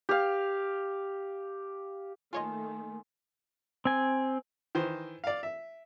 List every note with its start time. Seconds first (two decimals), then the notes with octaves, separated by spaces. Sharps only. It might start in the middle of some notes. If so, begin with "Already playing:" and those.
0.09 G4 F5
2.33 D#3 A3 A#3 F4 C#5 D#5 G#5 C6
3.85 C4 G#5
4.75 D#3 E3 C5
5.24 D5 F5
5.43 E5